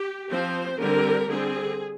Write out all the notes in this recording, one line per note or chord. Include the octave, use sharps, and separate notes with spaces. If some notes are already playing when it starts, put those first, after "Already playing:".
Already playing: G4
F3 C4 C5
D3 G3 C4 A#4
D3 G3 C4 G#4